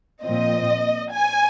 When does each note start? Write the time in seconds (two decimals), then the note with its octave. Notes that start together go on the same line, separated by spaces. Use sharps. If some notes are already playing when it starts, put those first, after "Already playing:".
0.24 A#2 F3 C4 D#5
1.11 G#5